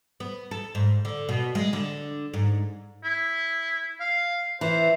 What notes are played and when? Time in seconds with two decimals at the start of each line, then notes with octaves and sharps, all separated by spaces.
0.20 B3
0.51 A4
0.75 G#2
1.05 D3
1.29 B2
1.55 G#3
1.73 D3
2.34 G#2
3.04 E4
4.00 F5
4.61 E3 C5